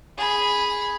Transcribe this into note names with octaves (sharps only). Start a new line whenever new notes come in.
G#4 B5